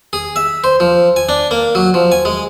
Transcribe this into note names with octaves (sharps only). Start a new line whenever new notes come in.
G#4
E5
C5
F3
G#5
D4
A#3
F#3
F3
G#5
G#3